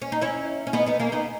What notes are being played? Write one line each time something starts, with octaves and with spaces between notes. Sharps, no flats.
C#4
D#4
C#4 E4
C#4
B3 D#4
B3 D#4
A#3 C#4
B3 D#4